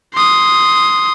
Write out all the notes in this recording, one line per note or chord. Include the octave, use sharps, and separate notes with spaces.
C6 D#6